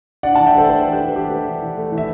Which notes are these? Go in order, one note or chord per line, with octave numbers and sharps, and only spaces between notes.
D4 D5 F#5
E3 F#5 A5
E5 G5
A3 A4 C5
E3 A4 C5
D4
G4 B4
E3
A3 G4 B4
E3
D4
E3
A3
E3
E5